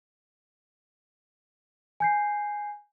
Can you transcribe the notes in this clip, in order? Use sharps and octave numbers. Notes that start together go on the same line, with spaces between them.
G#5 G6 C7